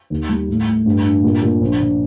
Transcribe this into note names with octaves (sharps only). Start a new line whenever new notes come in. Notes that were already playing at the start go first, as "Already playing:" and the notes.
D#2
G3
A2
A2
G2
D4
A#2
A#2
A#1
A#1